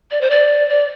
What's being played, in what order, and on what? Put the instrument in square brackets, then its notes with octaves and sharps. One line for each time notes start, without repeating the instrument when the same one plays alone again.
[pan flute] D5
C5
D5
D5